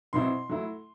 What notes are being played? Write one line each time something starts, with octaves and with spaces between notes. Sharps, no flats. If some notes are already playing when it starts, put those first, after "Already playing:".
B2 F#3 C4 E4 C6
F#3 A3 E4